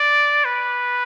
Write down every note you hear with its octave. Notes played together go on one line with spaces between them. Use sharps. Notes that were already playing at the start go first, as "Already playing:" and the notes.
Already playing: D5
B4